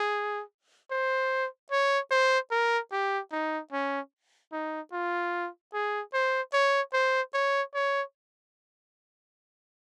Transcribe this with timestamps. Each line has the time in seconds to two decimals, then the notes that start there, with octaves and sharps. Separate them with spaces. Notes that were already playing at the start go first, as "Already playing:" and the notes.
Already playing: G#4
0.91 C5
1.71 C#5
2.11 C5
2.51 A#4
2.92 G4
3.32 D#4
3.72 C#4
4.52 D#4
4.92 F4
5.74 G#4
6.13 C5
6.53 C#5
6.93 C5
7.34 C#5
7.74 C#5